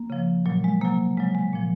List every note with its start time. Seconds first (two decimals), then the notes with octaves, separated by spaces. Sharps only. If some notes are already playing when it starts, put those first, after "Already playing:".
Already playing: A#3
0.10 C#3 F3
0.46 A#2 F#3
0.64 G#3
0.81 C3 F#3 A#3
1.17 C#3 F#3 G#3
1.35 G#3
1.53 A#2 F3